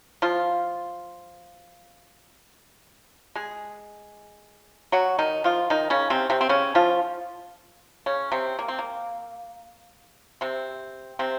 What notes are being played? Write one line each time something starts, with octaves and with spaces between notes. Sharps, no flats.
F3 F4
G#3 G#4
F#3 F#4
D#3 D#4
F3 F4
D#3 D#4
C#3 C#4
C3 C4
C3 C4
C4
C#3 C#4
F3 F4
C#3 C#4
C3 C4
A#3
C4
A#3
C3 C4
C3 C4